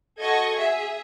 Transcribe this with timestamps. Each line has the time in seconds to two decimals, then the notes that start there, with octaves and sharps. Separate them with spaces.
0.20 F#4 A4 D#5 C#6 G#6
0.55 G#4 E5